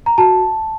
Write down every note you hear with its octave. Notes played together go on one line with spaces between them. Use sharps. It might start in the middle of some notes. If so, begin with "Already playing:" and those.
A#5
F#4 A5